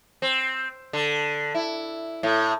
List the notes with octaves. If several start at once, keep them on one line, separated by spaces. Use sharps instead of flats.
C4
D3
E4
A2